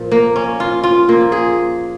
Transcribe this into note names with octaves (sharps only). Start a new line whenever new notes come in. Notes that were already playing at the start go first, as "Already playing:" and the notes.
Already playing: A#2 F3
A#3
C#4
F4
F4
A#2 F3 A#3
G#4